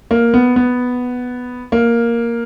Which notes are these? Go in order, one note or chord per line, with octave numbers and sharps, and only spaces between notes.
A#3
B3
B3
A#3